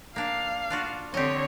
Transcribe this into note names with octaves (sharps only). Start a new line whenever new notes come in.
A#3 D4 F5
D4 F4 F#4
D3 C4 G4 C#5 D#5